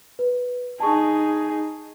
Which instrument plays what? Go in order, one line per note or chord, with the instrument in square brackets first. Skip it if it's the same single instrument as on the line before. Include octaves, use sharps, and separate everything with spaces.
[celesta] B4
[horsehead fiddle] D#4 G#4 [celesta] A5 C#6